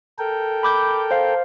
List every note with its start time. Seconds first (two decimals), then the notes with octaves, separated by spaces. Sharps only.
0.19 A4 A#4 G5
0.63 B5 D6 G6
1.11 C5 F5